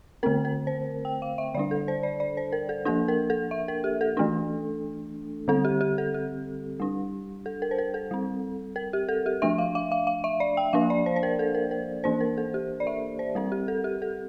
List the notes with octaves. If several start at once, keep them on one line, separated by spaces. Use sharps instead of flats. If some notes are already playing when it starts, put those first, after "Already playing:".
D3 A3 C4 A#4
A#4
C5
G5
F5
E5
D3 G3 D4 D5
A4
C5
D5
D5
C5
A#4
A4
F3 A#3 D4 A4
A#4
A4
E5
A#4
G4
A4
E3 A3 D4
D3 G3 C4 A4
G4
G4
A4
G4
G3 D4
A4
A#4
C5
A#4
A4
G3 C4
A#4
G4
A4
G4
F3 A3 D4 E5
F5
F5
F5
F5
E5
D5
G5
F3 A#3 D4 F5
D5
C5
C5
A#4
A4
A#4
A#4
E3 A#3 D4 C5
A#4
A4
G4
D5
E5
C5
G3 C4 A#4
G4
A4
G4
A4